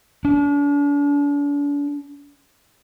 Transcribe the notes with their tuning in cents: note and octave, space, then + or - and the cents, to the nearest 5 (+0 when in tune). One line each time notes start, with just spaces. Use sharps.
D4 -40